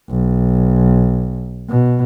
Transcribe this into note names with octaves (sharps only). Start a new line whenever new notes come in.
B1
B2